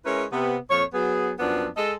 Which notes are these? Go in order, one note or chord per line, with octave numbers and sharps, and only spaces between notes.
G#3 C#4 E4 A#4 B4 C#5
C3 B3
F2 A#2 F3 C#5
F#3 B3 G#4
F#2 F3 B3 C4 D4
G#3 A4 D#5